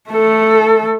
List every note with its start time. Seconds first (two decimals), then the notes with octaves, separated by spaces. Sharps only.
0.10 A3 A4